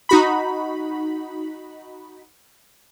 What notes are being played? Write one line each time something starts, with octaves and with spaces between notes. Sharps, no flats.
D#4 F#4 B5